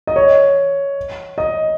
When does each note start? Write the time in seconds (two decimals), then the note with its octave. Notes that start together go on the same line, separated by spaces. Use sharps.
0.07 D#5
0.16 C#5
1.38 D#5